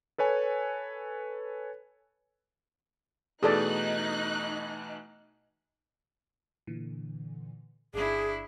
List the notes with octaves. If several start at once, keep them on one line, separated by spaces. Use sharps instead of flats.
A4 B4 C#5 G#5
B2 E3 A3 D#4 G#4 A4 D5 F#6
A#2 D3 E3
G1 D4 E4 G#4